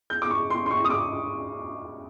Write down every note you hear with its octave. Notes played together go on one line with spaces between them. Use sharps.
G6
D6
C#6
C6
C6
C#6
D#6
D6